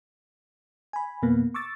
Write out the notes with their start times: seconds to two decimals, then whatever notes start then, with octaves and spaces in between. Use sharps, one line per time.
0.93 G#5 B5
1.22 F2 B2 A#3 B3
1.54 C#6 D6 E6 A6